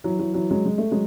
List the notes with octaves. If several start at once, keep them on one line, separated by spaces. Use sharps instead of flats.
E3 F#3
E3 F#3
E3 F#3
F#3 G#3
G#3
A3
F#3 G#3